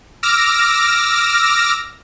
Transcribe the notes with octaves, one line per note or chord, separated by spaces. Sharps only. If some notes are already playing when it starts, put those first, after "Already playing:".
D6 E6 F6 A#6